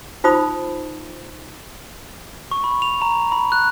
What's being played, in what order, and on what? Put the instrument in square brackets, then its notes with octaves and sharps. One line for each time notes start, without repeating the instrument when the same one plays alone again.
[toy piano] D#4 F4 C5 B5 D#6
[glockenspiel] C#6
B5
F7
A#5
B5
F#6